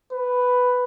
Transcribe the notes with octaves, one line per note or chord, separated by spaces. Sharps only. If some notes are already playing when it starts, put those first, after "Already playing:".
B4